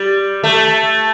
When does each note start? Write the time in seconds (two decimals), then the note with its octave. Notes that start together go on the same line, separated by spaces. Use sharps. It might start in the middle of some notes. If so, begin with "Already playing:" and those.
Already playing: G3
0.44 A3